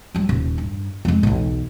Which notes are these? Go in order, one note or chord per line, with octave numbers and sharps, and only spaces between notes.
F#3 G3
D#1
G2
F2 G#3
B1 E2